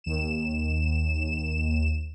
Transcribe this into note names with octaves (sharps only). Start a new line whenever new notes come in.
D#2 E7